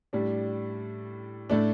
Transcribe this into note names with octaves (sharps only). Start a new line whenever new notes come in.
A2 G3 D4
A2 A3 D4